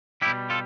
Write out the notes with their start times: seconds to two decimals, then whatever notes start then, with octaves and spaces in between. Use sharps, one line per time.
0.22 G3 E4 G4
0.27 B2
0.50 F4 A4